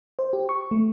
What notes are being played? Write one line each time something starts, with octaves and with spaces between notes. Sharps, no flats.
C5
G4
C#6
A3